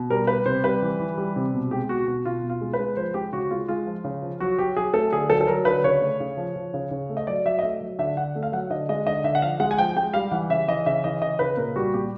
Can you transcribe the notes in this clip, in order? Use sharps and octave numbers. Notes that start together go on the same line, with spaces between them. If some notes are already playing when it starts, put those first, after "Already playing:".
Already playing: B2
G3 A#4
G3 B4
C3 C5
G3 B4
E3
E3
G3
C3
B2
G#3 G4
B2 F#4
B2 F#4
B2 F4
B2
F4
G#3
B4
G#3
F3 C5
G#3 G4
C#3 F#4
G#3 F4
G#3 F4
F3
C#3
F3
F#3 F#4
F#3 G4
F#3 G#4
A3 A4
D3 G#4
F#3 A4
A4
F#3 A#4
D3 B4
C#3 C#5
A3
C#3
F3
F3
C#3
C#3
A3
D#5
F#3 D5
F#3 E5
D#5
A3 E5
F#3
D3 E5
D3 F#5
A3
F5
F#3 F#5
D3 D#5
G#3 D#5
D3 D#5
D3 E5
F#5
F3 F5
G#3 F#5
G#5
F3 G5
G#3 G5
G3 F5
E3 F#5
C#3 E5
E3 D#5
C#3 E5
E3 D#5
C#3 D#5
C#3 B4
A#2 A#4
G3 F#4
A#2 G4